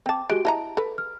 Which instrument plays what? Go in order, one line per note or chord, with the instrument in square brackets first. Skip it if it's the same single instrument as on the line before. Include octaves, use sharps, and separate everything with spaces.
[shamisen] C4 A5 [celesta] G5 D6
[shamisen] G#3 [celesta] F#4 G4 D7
[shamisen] E4 D#5 A#5 [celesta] A5
[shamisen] A4 B4
[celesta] F6